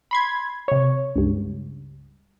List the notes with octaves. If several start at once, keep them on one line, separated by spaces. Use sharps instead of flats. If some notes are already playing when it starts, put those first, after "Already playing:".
B5 C6 G#6
C3 C#5
C#2 G2